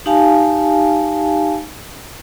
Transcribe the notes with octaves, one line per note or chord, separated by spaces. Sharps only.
D#4 G4 F5 G#5 A5